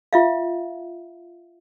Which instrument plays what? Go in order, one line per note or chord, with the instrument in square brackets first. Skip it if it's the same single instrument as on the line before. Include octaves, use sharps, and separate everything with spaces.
[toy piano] F4 E5 F5